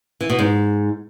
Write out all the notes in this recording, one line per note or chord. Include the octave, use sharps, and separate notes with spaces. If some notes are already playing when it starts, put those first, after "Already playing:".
E3
B2
G#2